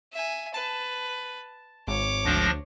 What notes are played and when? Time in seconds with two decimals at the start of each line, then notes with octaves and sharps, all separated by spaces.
0.13 E5 G#5
0.54 B4 A5
1.88 G#1 C#5 D6
2.25 D2 F3 D4 A#6